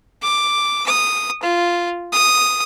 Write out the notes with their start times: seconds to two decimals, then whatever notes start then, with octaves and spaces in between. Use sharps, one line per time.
0.23 D6
0.86 D#6
1.43 F4
2.13 D#6